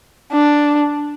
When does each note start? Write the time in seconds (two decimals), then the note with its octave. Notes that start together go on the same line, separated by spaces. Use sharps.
0.32 D4